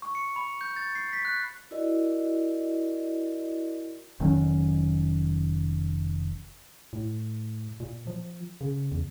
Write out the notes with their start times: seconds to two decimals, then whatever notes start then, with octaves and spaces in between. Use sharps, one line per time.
0.02 C#6
0.15 C#7
0.36 B5
0.61 G6
0.76 A6
0.95 C7
1.13 B6
1.25 F#6
1.71 E4 F#4 A#4 D5 D#5
4.20 F1 D#3 F#3 C#4
6.93 A2
7.80 A#2
8.07 F3
8.61 C#3
8.92 E2